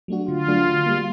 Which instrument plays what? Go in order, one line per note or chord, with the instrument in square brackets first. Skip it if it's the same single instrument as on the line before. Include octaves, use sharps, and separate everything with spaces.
[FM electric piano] F#3 A3 D4 F#4
[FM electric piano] D3 [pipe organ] F4
[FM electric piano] F#3 A3 D4 F#4
D3
G3 A#3